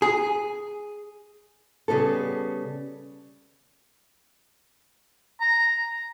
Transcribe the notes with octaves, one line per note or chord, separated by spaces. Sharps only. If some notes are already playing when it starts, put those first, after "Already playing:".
G#4
C#3 G3 B3 A4
A#5